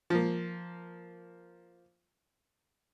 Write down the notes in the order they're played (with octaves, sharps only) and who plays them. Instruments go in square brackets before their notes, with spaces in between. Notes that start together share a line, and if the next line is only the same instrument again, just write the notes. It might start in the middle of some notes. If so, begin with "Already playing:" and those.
[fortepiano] F3 A#3